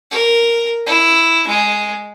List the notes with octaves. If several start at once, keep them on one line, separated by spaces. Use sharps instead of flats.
A#4
E4
G#3